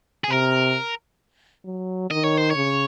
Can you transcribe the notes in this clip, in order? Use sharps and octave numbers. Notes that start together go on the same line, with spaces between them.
G#4
C3 A#4
F#3
D#3 D#5
C#5
C5
C#5
C#3